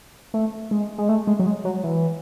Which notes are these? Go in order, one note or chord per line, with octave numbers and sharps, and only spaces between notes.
A3
G#3
G#3
A3
G#3
F#3
G#3
F#3
E3